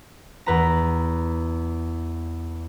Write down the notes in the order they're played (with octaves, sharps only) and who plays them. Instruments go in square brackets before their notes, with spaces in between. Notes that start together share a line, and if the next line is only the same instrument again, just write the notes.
[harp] E2 B4 A#5